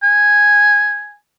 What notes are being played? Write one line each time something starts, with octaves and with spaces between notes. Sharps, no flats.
G#5